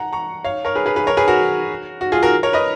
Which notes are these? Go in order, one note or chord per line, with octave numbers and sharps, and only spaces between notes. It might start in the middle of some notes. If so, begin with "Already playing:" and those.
Already playing: F#5 A#5
A#5 C#6
C#5 F5
A#4 C#5
G#4 B4
G#4 B4
G#4 B4
A#4 C#5
G#4 B4
F#4 A#4
F#4
F4 G#4
F#4 A#4
A#4 C#5
B4 D#5